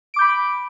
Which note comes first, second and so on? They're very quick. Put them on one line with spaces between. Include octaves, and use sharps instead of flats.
D7 D6 G6 B5